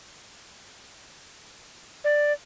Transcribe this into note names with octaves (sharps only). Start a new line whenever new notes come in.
D5